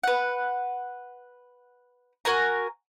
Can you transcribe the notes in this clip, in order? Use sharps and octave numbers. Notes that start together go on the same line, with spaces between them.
B4 F#5
F#4 A#4 G#5 A#5